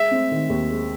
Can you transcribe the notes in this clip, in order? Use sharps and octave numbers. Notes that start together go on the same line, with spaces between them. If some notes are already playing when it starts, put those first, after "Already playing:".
Already playing: G#3 E5
C4
D#3
D#2
G#3